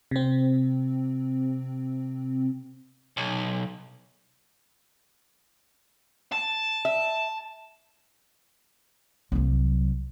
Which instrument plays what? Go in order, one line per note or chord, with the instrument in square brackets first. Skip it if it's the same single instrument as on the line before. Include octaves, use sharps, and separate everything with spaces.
[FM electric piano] C3 C4
[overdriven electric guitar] B1
A5
[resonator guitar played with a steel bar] E5
[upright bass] C2 F#3